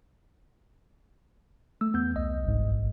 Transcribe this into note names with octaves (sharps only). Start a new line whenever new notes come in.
A3 E6
E2 B3 G6
C2 D#5
G1 G#2
A#1